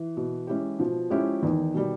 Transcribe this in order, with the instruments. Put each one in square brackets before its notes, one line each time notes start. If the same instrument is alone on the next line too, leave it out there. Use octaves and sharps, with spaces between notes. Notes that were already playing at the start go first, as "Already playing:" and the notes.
Already playing: [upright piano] E3
[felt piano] B2
G#3 C#4 E4 G4
[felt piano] B2 [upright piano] F3
[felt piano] G#3 C#4 E4 G4
[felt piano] E2 [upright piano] D#3
[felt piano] B2 G3